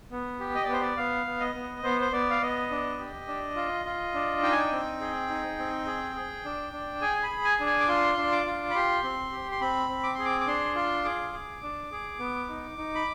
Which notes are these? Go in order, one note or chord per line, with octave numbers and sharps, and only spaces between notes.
B3
G4
D#5
D5
B3 C5
D5
B3 F5
B3
D#5
B3
B3 C5
C5
B3 D5
F5
B3 D#5
D4
G4
D4
F4
F4
D4
D#4 G5
G#5
G5
C4
G#4
D#4
C4
G#4
G#4
D4
D4
G#4 G#5
B5
G#4
G#5
D4
G#5
D6
F4 C6
D4
D6
F4
B5
G4 C6
C4
G4
C6
C4 B5
C4
D6
G#4 C6
D6
D6
D4 C6
F4 C6
G#4 D6
G#4
D4
G#4
B3
D#4
D#4
B5